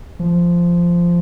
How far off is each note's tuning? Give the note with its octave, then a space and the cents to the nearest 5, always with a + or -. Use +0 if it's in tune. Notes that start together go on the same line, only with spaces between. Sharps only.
F3 -10